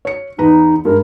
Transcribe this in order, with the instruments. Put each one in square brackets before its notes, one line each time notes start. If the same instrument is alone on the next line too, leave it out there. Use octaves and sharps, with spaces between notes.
[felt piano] C#5 C#7
[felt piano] E2 B4 A#5 [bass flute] D#4
[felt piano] G2 G#3 [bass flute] A#4